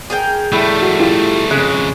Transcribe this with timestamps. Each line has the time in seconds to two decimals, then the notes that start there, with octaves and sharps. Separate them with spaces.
0.10 G#4 A#4 G5
0.52 A2 G3 A3
0.82 F#4
1.00 E4 F4 G4
1.51 F2 C#3 G#3 F#6